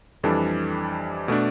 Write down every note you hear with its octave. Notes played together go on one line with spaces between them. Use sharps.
F2 E3 G3 D4 A4
B2 A3 D4